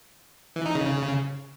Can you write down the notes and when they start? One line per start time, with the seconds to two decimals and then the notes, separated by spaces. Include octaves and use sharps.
0.56 E3
0.66 D#4
0.75 C#3